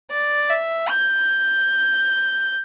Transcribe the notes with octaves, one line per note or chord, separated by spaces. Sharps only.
D5
E5
G6